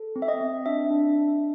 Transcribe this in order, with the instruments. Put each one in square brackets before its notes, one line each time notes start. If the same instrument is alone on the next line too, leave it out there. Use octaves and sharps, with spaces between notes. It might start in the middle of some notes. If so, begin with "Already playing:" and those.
Already playing: [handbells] A4
C4
E5
D#5
C4
D4 E5
D4